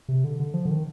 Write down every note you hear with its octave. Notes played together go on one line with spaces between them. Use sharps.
C3
D3
D3
F3
D3
D#3